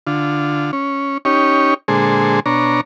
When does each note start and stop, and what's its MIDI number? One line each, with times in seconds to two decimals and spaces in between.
0.07 0.71 50
0.07 0.71 65
0.73 1.18 61
1.25 1.74 61
1.25 1.74 63
1.25 1.74 67
1.25 1.74 73
1.88 2.40 46
1.88 2.40 50
1.88 2.40 56
1.88 2.40 68
1.88 2.40 69
1.88 2.40 72
2.46 2.81 47
2.46 2.81 62
2.46 2.81 73
2.46 2.81 82